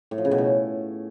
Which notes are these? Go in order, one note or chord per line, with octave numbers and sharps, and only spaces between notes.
A2
F3
C#3
B2
A2